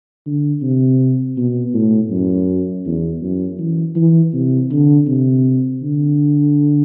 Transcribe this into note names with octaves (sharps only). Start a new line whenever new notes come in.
D3
C3
B2
A2
F#2
E2
F#2
E3
E3
C3
D3
C3
D3